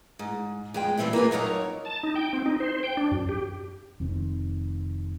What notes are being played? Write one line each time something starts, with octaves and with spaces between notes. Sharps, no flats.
G#2
F2 G#3 G5
A2 E3 G3 C4 E4 G4
A#3 F4 B4 G#5
F2 F#3 D#4 A#4 C#5
A5
D#4
G5
C4
D#4
C5
G5
D4
F#2
G4
F1 D#3 C4